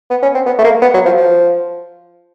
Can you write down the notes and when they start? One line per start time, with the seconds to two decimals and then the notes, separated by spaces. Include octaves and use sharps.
0.10 B3
0.22 C#4
0.34 C4
0.46 B3
0.58 A3
0.64 A#3
0.81 B3
0.94 F#3
1.06 F3
1.17 F3